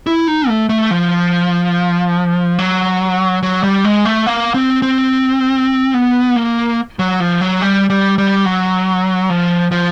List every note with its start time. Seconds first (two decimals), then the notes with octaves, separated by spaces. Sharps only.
0.07 E4
0.28 D#4
0.48 A3
0.69 A3
0.91 F3
2.59 F#3
3.43 F#3
3.63 G3
3.85 G#3
4.05 A3
4.26 A#3
4.54 C4
4.82 C4
5.94 B3
6.36 A#3
6.99 F#3
7.20 F3
7.41 F#3
7.62 G3
7.90 G3
8.18 G3
8.46 F#3
9.30 F3
9.72 F3